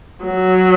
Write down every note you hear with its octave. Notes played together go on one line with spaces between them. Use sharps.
F#3